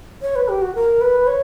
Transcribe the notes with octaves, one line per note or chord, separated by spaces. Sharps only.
C#5
B4
G4
F#4
A#4
B4
C#5